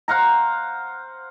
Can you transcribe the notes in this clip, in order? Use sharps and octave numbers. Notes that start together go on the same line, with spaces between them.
C5 F5 F#5 A#5